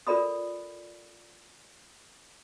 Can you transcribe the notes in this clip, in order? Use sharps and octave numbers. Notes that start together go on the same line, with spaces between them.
F4 A4 A#4 D5 B5 D#6